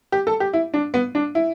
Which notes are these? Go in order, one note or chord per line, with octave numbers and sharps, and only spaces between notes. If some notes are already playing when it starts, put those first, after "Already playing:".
G4
A4
G4
E4
D4
B3
D4
E4